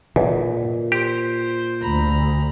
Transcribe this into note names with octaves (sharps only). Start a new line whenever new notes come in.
B1 E2 A#2
G4 C5
D2 A#5 B5